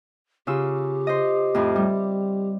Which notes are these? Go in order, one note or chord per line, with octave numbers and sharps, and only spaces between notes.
C#3 F4 G4 E6
C5 D#5
F2 A2 F3
G3